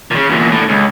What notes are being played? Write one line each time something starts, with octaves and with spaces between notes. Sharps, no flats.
A#2 C#3
E2 A#2
A2 D3
C#2